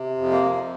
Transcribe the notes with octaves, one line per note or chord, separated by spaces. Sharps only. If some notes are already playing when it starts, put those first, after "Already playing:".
Already playing: C3
F2
A#3
F2